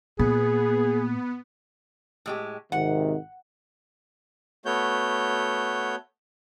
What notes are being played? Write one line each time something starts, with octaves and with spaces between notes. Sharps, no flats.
A#2 B3 G#4
A2 G#3 G4
G#1 C3 D#3 F#5
A3 B3 F#4 C#5 G6